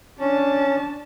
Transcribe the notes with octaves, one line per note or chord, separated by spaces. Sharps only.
C#4 D4 A5